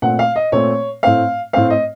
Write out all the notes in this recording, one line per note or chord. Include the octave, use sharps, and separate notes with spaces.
A#2 A3 C4 F#5
F5
D#5
A#2 A3 C4 C#5
A2 A3 C4 F5
A2 A3 C4 F5
D#5